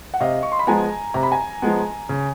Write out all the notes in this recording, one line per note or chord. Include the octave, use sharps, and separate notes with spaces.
F#5
C3 D#5 F5
C#6
C6
B5
F3 G#3 B3 G#5 A#5
C3 A#5
B5
G#5 A#5
F3 G#3 B3
C#3